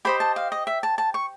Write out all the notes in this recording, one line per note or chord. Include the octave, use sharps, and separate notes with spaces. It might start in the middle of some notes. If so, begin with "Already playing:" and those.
G4 C5 D#5 B5
A5
F5
D#5
E5
A5
A5
C#6